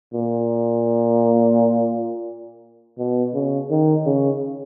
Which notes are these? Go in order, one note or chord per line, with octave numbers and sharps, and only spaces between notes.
A#2
B2
C#3
D#3
C#3